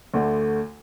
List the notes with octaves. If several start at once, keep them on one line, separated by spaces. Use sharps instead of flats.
D2 D3 A3